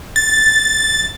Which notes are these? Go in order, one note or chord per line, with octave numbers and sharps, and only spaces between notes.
A6